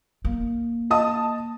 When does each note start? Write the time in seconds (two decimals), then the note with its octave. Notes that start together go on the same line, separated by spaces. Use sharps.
0.25 A#3
0.90 D#5 A5 D#6